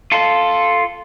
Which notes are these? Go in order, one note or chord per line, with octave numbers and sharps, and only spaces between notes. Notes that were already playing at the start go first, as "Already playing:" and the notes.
F4 A4